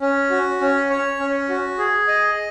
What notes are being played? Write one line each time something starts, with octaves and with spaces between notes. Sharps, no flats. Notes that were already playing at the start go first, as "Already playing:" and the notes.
C#4
F#4
C#4
C#5
C#4
F#4
G#4
D#5